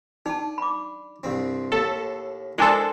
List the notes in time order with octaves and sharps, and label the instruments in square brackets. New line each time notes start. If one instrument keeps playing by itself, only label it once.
[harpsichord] D4 [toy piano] D#4 A5
[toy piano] B5 D6
[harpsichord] C2 G2 C4
[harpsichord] D#2 A2 [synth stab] A4
[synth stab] G#3 D4 A4 [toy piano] E4 G#5 C6 [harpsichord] A#4 C5